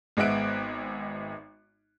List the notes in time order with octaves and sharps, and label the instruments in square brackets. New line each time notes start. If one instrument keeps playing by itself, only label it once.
[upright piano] G#1 G#3 B3 E5 F#6 D7